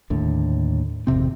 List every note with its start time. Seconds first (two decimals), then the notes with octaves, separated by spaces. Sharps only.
0.10 D#2 A2 D3
1.07 G#1 F2 C3 C4